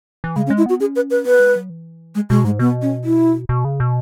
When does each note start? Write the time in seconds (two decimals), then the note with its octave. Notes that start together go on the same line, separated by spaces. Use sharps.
0.24 E3
0.36 C#3 G#3
0.47 C#4
0.50 G#3
0.58 E4
0.66 B3 F#4
0.80 C#4 G#4
0.96 B4
1.10 B4
1.25 B3 B4
1.40 G#3
1.56 F#3
1.70 E3
2.15 G#3
2.30 B2 G#3
2.44 G#2 G#3
2.59 B2 B3
2.82 C#4
3.04 E4
3.49 B2
3.65 C#3
3.80 B2